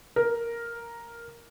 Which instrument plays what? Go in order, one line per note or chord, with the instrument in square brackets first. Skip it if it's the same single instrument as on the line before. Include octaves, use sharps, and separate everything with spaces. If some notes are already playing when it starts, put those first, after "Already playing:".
[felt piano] A#4